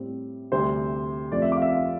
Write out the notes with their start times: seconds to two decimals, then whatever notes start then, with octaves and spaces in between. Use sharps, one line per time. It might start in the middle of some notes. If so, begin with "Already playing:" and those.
Already playing: A2 G3 C4
0.52 D2 C3 G3 C4 C5
1.31 F2 C3 F3 A3 C4 D5
1.42 E5
1.52 D6
1.57 F5
1.62 E5
1.72 F5